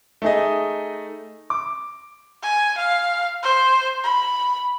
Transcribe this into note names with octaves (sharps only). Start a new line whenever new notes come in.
A3 D#4 G#4 D#5
D6
G#5
F5
C5
B5